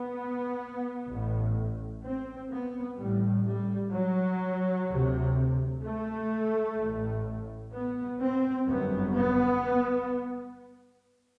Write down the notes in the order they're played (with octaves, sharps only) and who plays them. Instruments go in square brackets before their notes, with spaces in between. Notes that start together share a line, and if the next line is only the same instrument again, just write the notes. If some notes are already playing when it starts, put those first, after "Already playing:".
Already playing: [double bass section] B3
A1 A2
C4
B3
A1 A2 G3
G3
F#3
D2 C3
A3
A1 A2
B3
C4
G1 F#2 B3
B3